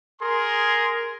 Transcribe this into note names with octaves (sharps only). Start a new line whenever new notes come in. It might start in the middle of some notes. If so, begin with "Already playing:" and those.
G#4 A#4 C6